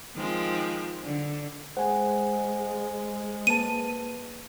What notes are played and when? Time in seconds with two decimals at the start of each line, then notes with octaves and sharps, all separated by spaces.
0.15 D#3 F3 G#3 C4
1.02 D3
1.77 G#3 C5 F#5 G#5
3.47 A#3 B4 A5 D#7